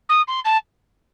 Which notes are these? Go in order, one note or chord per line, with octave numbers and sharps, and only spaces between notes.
D#6
C6
A5